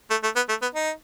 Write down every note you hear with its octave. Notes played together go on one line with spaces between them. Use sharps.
A3
A3
B3
A3
B3
D#4